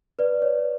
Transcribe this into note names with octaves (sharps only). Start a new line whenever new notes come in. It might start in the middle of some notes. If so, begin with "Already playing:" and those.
B4 D5
C#5